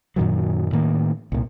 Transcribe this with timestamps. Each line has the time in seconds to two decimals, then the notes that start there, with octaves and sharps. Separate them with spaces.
0.16 F#2 A#2 D#3 F#3
0.72 A2 D#3 A#3
1.32 C2 A#2